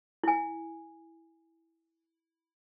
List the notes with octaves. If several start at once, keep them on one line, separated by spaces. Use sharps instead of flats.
E4 G#5